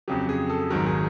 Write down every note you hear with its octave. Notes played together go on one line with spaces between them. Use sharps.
F2 C#3 F#3 G4
G#4
A4
G#1 G#2 D#3 F#3 A#4
G#4